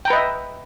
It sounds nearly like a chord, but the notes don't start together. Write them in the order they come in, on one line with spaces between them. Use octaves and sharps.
G5 A#5 B4 D#5 E5